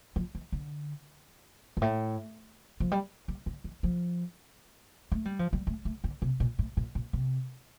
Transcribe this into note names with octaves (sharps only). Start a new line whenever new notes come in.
F3
E3
D3
G2
A2
F3
G3
G3
D3
E3
F3
A3
G3
F3
G3
A3
A3
D3
C3
A#2
A2
A#2
A#2
C3